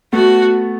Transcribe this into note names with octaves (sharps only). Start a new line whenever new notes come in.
A3 B3 F#4